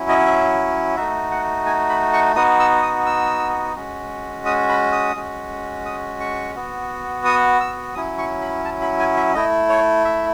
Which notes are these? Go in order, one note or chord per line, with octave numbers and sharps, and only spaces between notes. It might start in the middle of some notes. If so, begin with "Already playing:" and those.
Already playing: F#3 C#4 E4
D#5
E5
A3 D#4 F#4 E5
F#5
G#5
B5
C#6
B3 D#4 F#4 D#6
E6
D#6
E6
G#3 C#4 F#4
D#6
B5
D#6
G#3 C#4 F#4
D#6
C#6
B3 F#4
D#6
E6
F#3 C#4 E4 D#6
C#6
B5
A5
B5
G#5
E5
A3 E4 D#5
C#5
E5